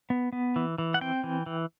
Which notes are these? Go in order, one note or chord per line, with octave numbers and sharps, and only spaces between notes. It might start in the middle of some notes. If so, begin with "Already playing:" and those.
B3
B3
E3
E3
F#5
C4 G5
E3
E3